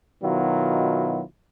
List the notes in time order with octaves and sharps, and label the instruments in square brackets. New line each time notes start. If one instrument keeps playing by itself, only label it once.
[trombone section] B2 D#3 F#3 E4 F4